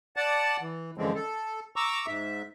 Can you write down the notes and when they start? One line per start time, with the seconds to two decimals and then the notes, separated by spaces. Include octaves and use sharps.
0.17 D5 F#5 A5
0.61 E3
0.98 F#2 D3 E3 F3 G#3 C4
1.15 A4
1.76 A#5 C#6 D6 E6
2.07 G#2 E5